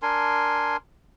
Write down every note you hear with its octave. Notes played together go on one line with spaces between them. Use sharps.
D4 A#4 G#5 C6